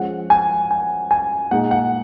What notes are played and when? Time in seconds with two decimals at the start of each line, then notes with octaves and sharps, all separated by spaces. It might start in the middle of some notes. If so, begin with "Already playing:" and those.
Already playing: F3 G#3 C#4 F#5
0.30 G#5
0.71 G#5
1.11 G#5
1.51 A#2 G#3 D#4 F#5
1.71 F#5